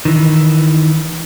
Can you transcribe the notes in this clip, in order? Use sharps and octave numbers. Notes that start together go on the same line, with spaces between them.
D#3 E3